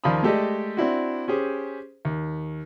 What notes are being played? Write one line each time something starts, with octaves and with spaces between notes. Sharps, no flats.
D#2 F3 F4 D5 B5 D#6
G#3 A3 G4 A4 D5 D#5
C4 D4 E4 F#4
C#4 G4 G#4 C5
D#2